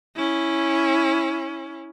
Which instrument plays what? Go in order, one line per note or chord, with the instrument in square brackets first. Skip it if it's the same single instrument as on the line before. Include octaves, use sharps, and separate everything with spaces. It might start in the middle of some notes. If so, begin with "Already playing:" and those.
[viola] C#4 E4